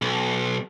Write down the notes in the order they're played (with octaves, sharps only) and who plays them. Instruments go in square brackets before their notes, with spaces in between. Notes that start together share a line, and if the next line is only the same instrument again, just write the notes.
[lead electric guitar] B1